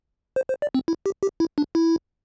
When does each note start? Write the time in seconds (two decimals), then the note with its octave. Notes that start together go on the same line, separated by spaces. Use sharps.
0.36 C5
0.49 C5
0.62 D5
0.74 C4
0.88 E4
1.06 G4
1.23 G4
1.40 E4
1.58 D4
1.75 E4